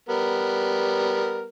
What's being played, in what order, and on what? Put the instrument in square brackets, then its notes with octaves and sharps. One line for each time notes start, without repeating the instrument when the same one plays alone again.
[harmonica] G3 B3 A#4